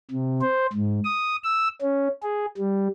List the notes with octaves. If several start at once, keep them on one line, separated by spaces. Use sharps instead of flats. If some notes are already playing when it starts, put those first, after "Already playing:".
C3
C5
G#2
D#6
E6
C#4
G#4
G3